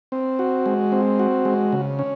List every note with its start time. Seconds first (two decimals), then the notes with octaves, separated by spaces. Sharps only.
0.12 C4
0.39 F#4
0.66 G#3
0.92 C4
1.19 F#4
1.45 G#3
1.73 C#3
1.99 C#4